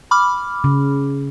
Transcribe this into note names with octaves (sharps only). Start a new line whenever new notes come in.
B5 D6 F6
C#3